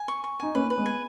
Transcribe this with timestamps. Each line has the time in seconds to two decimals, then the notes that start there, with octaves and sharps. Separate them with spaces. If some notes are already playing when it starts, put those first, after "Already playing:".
Already playing: G#5
0.08 C#6
0.24 C#6
0.40 D#4 G#5
0.55 A#3 C#4 B4
0.70 B4
0.78 G#3 B3
0.86 G#5